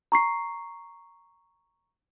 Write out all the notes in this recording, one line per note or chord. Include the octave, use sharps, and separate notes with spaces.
A#5 C#6 C7